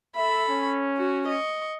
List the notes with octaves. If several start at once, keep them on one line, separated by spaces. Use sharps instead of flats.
A4 E5 B5
C#4
F#4
D#5 C#6